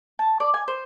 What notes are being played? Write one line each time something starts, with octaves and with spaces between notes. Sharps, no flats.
A5
D5
G#5
C5